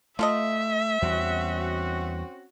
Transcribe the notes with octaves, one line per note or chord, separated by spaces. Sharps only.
A3 F4 A4 D#5 E5
E2 G3 C4 C#4 F#4